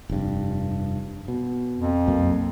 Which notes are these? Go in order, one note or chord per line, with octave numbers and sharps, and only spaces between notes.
F1 G2
B2
F2
B1 F#2 A#3